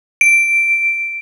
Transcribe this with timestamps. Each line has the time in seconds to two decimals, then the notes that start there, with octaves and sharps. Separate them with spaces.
0.21 D7